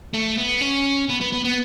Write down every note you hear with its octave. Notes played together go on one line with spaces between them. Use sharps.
A3
B3
C#4
B3
B3
B3
B3